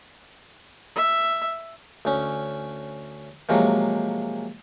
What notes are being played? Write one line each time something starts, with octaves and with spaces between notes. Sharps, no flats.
E5
D2 C#4
C3 F3 F#3 G#3 A#3